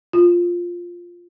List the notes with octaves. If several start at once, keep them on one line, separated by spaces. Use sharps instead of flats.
F4